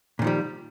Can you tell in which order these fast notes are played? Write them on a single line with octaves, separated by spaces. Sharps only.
A#2 D#3 F3 G3